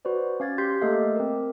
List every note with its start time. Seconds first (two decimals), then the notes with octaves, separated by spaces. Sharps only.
0.05 F#4 B4 C5 D5
0.40 C#4 F5 G#6 A6
0.58 G4 C6 G6 B6 C7
0.82 A3 A#3 A4 D#5 F5
1.16 C4 A#4